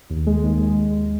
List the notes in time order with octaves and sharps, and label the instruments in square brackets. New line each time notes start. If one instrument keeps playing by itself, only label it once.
[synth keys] D#2
G#3
D#2
G#3
D#2